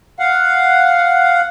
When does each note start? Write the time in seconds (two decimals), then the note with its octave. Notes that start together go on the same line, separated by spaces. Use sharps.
0.19 F5 F#5